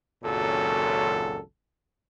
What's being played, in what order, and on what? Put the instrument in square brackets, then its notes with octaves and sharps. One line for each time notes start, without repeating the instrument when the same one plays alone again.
[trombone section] G#1 C#2 F#2 A#2 F#3 A4